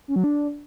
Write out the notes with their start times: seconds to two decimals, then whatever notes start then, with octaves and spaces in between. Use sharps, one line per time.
0.08 C#4
0.16 F#3
0.24 D4